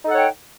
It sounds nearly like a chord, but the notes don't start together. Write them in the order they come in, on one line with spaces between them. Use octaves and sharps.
D#4 A4 F#5 C#5 G5